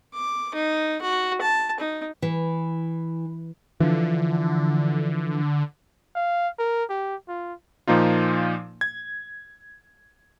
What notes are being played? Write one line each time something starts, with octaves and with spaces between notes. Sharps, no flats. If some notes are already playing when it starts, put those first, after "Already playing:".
D6
D#4
F#4
A5
D#4
E3
D3 E3 F3
F5
A#4
G4
F4
A#2 F3 A#3 D#4 F4
G#6